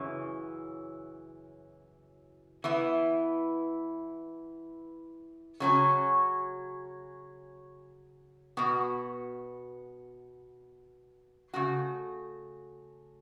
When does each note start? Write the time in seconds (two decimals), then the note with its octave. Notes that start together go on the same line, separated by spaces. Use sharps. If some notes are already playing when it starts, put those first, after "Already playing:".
Already playing: F#2 C#3 E3
2.64 E3 B3 E4
5.60 C#3 F#3 C#4 F#4
8.57 B2 B3 F#4
11.54 C#3 A3 F#4